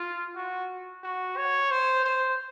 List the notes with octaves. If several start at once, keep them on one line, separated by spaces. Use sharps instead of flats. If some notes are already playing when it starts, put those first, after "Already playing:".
Already playing: F4
F#4
F#4
C#5
C5
C5